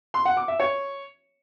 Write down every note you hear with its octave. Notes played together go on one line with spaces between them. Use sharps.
C6
F#5
D6
E5
C#5